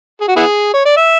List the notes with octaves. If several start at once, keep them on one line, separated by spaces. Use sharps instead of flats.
G#4
F#4
B3 E4 G#4
C#5
D5
E5